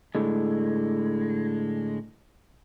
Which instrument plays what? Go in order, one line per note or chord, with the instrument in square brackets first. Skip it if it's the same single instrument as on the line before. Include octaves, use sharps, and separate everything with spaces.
[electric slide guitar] A2 D3 G#3